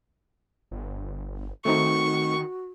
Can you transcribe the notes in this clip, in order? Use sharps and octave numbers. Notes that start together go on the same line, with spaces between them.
G1
D#3 A3 C4 D#4 F#4 C#6